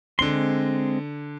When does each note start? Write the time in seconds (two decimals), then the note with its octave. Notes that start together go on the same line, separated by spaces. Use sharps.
0.19 D3 G#3 C4 C6 G7